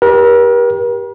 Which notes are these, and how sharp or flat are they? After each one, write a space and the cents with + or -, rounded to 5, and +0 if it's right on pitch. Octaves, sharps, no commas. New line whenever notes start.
G4 +0 A#4 +45